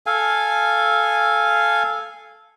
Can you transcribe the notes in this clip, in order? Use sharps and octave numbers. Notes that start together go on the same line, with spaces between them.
A4 F5 G#5